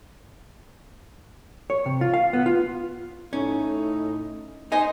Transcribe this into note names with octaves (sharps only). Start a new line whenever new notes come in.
C#5
C3
F4
F5
B3
F4
A2 C#4 D#4
D#4 C5 D#5 G#5